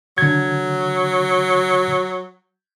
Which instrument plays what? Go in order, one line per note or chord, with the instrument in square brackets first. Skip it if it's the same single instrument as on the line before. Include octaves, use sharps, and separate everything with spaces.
[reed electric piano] D3 G#6 [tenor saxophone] F#3